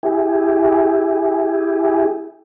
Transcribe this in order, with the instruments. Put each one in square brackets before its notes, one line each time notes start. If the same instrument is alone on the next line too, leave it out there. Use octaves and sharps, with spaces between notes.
[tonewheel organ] E4 G4 G#4